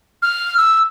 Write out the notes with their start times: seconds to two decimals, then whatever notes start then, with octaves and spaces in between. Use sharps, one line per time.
0.22 F6
0.57 E6